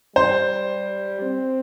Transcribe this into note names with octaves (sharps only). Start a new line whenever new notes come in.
G3 C5
C4